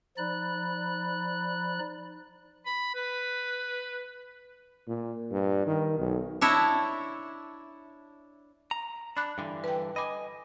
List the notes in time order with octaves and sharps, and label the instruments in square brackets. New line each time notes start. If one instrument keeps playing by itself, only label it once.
[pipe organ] F3 D#4 D5 B5 F#6
[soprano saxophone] B5
B4
[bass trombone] A#2
G2
D#3
B1
[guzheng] D4 E4 C#5 D#5 E5
[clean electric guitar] A#5
[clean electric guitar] D4 [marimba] B5 D6 F#6
[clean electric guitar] G2 D3 E3
[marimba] B4 G5
[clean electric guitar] D#5 G#5 [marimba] B5 D6